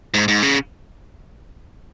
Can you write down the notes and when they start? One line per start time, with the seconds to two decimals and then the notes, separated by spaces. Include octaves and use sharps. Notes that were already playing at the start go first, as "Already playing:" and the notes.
0.14 G#2
0.28 G#2
0.43 C#3